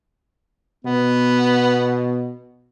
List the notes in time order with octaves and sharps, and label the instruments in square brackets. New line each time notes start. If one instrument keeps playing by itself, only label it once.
[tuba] B2 [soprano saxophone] B3